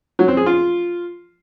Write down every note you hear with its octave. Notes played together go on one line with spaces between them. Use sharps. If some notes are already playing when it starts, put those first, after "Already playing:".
F#3
C4
G#4
F4